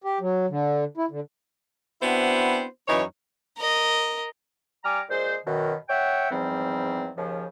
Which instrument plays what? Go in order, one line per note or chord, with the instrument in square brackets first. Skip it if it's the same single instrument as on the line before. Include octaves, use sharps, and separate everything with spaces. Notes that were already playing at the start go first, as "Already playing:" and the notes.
[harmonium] G4
F#3
D3
E4
D3
[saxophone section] B3 C4 D4 E4 F#4 C5
F#2 E3 D#4 C#5
[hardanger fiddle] A#4 D#5
[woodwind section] G3 G#5 A#5 D6 F6
A#2 G#3 C5
F#2 B2 D#3
C#5 E5 F#5 G5
E2 G#2 F3 G3 C4
D#2 C#3 F3